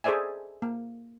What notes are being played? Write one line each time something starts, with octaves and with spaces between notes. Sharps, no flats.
G#4 A4 C5 D5 E5 G#5
A#3